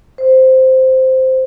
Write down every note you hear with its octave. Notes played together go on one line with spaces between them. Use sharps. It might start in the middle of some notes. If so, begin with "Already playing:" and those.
C5